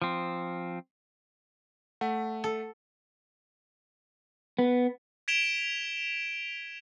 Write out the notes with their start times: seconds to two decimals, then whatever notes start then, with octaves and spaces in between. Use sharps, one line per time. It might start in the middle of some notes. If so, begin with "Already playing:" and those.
0.02 F3 C4
2.01 A3 F#5
2.44 A4
4.59 B3
5.28 G#6 B6 D7 E7 F7 G7